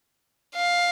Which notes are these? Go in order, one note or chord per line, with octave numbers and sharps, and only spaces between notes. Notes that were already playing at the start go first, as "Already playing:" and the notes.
F5